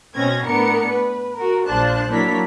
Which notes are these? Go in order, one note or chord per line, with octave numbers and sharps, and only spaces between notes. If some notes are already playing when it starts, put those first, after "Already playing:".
B2 C4 C#4 G#6 A#6
A2 B3 D4 A#4 C#7
B4
F#4 A#4
A#1 F3 D4 C5 A5 F#6
F#3 A#3 D4 E4 A#4 B6